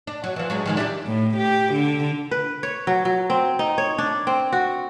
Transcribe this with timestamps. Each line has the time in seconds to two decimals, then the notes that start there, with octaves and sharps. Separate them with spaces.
0.07 D4
0.24 F#3
0.36 E3 F3
0.50 F#3 G#3 D4
0.66 D#3 F3 G#3
0.77 D4 E4 G4
1.07 A2
1.36 G4
1.73 D3
2.31 B4
2.63 C#5
2.87 F#3
3.05 F#3
3.30 C4
3.59 D#4
3.78 C#5
3.98 D4
4.27 C4
4.53 F#4